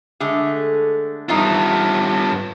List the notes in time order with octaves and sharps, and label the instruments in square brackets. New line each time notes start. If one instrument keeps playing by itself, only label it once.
[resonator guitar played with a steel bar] D3 G#3 A3
[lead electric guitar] G2 F4 [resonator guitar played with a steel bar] E3 F3 D#4